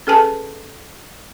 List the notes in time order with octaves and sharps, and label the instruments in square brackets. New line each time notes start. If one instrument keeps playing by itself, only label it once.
[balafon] C#4 G#4 A4 B4 G#5 A5